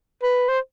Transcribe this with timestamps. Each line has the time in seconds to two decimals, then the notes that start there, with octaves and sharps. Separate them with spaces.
0.23 B4
0.49 C5